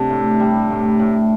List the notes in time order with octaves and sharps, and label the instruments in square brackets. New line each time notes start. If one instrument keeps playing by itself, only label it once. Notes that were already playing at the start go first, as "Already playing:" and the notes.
Already playing: [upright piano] C3 [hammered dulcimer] A3 D4
[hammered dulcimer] A2
G3
A2
A2